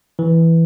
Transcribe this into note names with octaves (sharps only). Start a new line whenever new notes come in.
E3